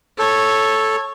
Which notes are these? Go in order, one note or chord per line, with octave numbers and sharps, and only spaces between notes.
A4 C#5